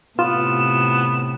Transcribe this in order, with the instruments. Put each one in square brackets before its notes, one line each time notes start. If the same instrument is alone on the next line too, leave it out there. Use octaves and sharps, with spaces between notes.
[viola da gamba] A2 C3 [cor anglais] B3 [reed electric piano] F4 [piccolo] E7